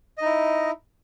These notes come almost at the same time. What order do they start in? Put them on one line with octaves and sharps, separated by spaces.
D#5 D#4 E4